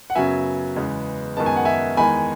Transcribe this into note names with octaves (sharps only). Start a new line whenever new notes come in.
F#5
F#2 C#3 F#3 B3 E5 G#5
E2 C#3 G#3 B3
F#2 D#3 G#3 B3 A5
G#5
F#5
E5 G#5
E2 D#3 G#3 G#5 B5